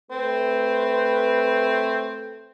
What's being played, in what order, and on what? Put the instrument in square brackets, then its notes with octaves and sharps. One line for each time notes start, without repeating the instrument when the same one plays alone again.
[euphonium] A3 [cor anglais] C4 [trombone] B4